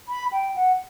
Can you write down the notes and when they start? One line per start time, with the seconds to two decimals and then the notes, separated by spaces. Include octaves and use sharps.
0.08 B5
0.32 G5
0.56 F#5